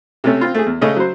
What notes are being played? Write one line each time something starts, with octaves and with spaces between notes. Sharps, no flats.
C3 A3 C#4
C4 F4
A3 G#4
E2
C#3 A3 C#4 D#5
F#3 C5